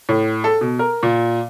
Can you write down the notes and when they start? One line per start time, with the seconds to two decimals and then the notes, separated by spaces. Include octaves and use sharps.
0.09 A2
0.44 A4
0.61 B2
0.79 A#4
1.03 A#2